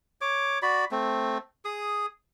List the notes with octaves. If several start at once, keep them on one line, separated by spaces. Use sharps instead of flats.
C#5 D6
F#4 D5 B5
A3 C4
G#4 D#6